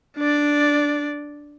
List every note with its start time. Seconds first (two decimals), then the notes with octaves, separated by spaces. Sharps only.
0.17 D4 D5